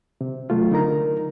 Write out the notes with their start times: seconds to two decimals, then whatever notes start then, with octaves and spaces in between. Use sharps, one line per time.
0.21 C3
0.50 F#3 A3 F4
0.71 D3 D#4 A#4 A#5